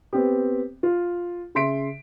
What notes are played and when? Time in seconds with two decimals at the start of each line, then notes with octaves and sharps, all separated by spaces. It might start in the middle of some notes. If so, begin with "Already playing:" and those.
0.13 B3 C4 G4
0.83 F4
1.55 C#3 E5 C6 B6 D7